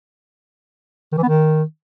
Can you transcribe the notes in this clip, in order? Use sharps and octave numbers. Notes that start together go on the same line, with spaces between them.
D#3
E3
B3
D#3